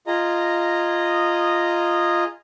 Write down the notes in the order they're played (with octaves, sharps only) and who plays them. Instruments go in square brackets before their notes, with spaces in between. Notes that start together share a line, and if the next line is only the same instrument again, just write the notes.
[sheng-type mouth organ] F4 G#4 D#5 A#5